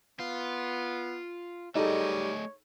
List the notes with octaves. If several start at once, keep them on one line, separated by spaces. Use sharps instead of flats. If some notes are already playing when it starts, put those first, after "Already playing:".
B3 F4
G3 A3 D#4 G#4 A4 C#5 D#5